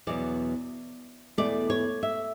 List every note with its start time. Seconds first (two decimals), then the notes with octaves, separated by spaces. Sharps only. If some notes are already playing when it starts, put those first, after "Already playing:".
0.07 E2 B2 F#3 D5
1.38 E2 B2 A3 D5
1.70 C#5
2.03 E5